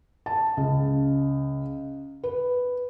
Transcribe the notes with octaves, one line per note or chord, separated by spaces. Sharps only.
A5
C#2
B4